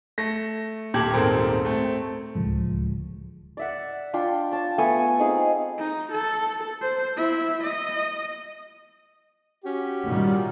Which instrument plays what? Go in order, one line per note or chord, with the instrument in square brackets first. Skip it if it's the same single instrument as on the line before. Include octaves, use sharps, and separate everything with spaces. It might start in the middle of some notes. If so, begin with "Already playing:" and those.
[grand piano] A3 A#6
D#1 A#2 G4 A5 G#6 F#7
D#1 G#2 C4 A4 A#4
A3 C4
[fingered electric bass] D1 C#2 F3 G#3
[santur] D5 E5 F#5
D4 F4 G5
C#5 A5
A3 B3 A4 G#5
C4 D#4 G#4 F5
[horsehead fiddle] D#4
A4
C5
E4 E5
D#5
[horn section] C#4 F#4 G4
[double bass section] A#2 D#3 G3